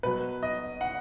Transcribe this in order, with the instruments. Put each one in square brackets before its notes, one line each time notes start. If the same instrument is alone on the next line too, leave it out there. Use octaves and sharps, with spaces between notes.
[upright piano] B2 F#3 B4
D#5
F#5